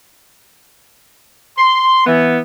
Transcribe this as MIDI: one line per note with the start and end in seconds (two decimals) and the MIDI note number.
1.57 2.04 84
2.06 2.39 52
2.06 2.39 59